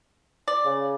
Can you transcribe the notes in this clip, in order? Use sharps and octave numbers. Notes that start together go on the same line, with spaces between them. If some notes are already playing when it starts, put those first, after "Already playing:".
D5
C#3